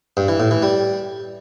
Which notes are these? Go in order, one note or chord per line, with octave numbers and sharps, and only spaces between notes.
G2
E3
A2
E3
G3